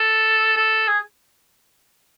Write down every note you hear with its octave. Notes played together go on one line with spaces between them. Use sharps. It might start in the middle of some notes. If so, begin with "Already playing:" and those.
Already playing: A4
A4
G#4